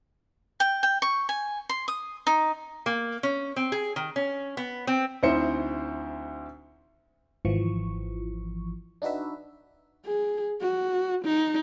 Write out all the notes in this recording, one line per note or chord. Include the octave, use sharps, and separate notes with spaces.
G5
G5
C#6
G#5
C6
D#6
D#4
A#3
C#4
C4
G#4
D#3
C#4
B3
C4
D2 C4 D#4 E4 C5 C#7
G#1 E3 F3 C#6
D4 D#4 F#4 B4 E5
G#4
F#4
D#4